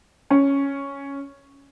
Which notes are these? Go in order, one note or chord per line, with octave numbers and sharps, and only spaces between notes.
C#4